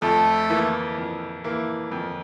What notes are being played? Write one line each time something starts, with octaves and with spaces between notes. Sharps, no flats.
F2 A3 A4
E3 A#3 E4
F2
E3 A#3 E4
F2